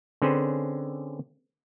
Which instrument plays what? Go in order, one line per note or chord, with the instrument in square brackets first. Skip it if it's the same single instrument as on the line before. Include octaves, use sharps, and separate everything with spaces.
[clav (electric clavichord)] D3 C4 C#4 G#4 B4 C5